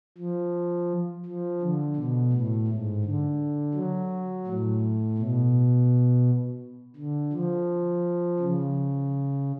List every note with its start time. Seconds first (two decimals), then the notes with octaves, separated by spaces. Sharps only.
0.18 F3
1.25 F3
1.61 D3
1.96 B2
2.33 A2
2.67 G#2
3.04 D3
3.74 F#3
4.47 A2
5.18 B2
6.96 D3
7.33 F3
8.39 C#3